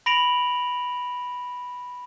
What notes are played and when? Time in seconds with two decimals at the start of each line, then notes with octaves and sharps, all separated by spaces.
0.06 B5 A#6 D7 F7 F#7